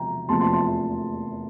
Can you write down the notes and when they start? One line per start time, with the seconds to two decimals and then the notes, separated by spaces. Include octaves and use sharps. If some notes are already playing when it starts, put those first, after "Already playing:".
Already playing: E1 C3 F3 G5 A#5
0.29 F1 E2 C3 F3 A#3 A5 C6
0.41 A5 C6
0.53 A5 C6